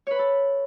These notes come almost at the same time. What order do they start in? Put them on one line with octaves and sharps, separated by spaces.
C#5 B4 B5 A4